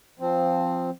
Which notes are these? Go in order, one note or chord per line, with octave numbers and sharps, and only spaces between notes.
F3 C4